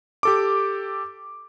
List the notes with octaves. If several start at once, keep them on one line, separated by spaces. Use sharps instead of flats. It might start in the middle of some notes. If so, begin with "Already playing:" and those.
G4 A4 D6